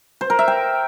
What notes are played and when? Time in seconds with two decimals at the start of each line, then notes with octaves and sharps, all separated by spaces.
0.21 C5
0.30 A#4
0.39 E5
0.48 G5